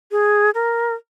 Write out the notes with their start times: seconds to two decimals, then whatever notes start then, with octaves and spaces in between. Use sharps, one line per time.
0.11 G#4
0.54 A#4